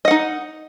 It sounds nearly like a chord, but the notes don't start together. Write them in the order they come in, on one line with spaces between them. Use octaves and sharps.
D#5 F#5 D#4